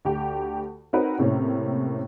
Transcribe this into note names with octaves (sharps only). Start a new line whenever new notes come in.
D2 G4
C4 D#4 F#4 A#4 B4 C#5
A2 C3 A#3 C#4